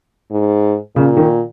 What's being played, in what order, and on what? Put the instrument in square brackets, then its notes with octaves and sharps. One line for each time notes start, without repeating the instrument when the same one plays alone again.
[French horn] G#2
[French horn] A#2 [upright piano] C#3
[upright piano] D#3